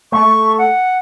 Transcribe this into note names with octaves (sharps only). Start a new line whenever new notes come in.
A3 C#6
F#5